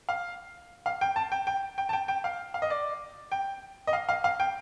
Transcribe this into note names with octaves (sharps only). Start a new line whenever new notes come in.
F5
F5
G5
A5
G5
G5
G5
A5
G5
G5
F5
F5
D#5
D5
G5
D#5
F5
F5
F5
G5